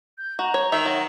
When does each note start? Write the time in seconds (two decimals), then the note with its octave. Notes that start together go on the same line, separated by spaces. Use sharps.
0.18 G6
0.39 F#4 A#5
0.54 C#5
0.72 D#3 E5
0.86 F#3